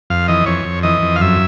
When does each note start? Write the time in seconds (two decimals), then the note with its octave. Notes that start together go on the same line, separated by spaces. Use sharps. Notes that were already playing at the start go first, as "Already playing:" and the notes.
0.10 F2 F5
0.28 E3 D#5
0.46 F2 C#5
0.65 F2
0.83 E3 D#5
1.02 F2
1.16 F5
1.21 F#2 E5